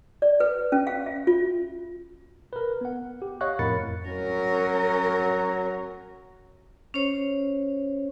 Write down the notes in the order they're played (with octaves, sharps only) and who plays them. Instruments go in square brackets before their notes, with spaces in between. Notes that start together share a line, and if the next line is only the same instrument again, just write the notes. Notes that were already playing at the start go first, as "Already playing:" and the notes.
[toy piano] D5
B4
C#4
F5
E5
F4
[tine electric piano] A#4 B4
B3 F#5
G4
C#5 D#5 F5 F#5 C#6 F#6
F2 A2 A#4 B5 A6 C#7
[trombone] F#3 [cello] C#4 A#4
[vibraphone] C#4 C5 C#5